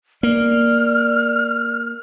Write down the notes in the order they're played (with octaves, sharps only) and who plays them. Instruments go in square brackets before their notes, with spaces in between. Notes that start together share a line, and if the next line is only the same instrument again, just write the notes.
[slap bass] A#3 [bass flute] D5 [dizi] F6